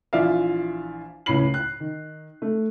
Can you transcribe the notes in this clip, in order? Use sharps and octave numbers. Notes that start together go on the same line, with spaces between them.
A#1 E3 F4 D5 E5 F5
C#2 A2 C#5 B5 C7 F#7
F#6
D#3
A3